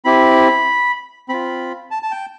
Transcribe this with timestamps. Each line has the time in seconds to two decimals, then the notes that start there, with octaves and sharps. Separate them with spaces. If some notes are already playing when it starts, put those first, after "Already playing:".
0.05 C4 E4 G4 B5
1.29 C4 F4 B5
1.91 A5
2.03 A5
2.11 G5